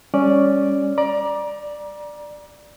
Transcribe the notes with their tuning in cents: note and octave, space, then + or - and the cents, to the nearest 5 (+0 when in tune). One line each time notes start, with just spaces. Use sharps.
G3 +30 C#4 +5 D5 +0
D5 +10 A#5 +30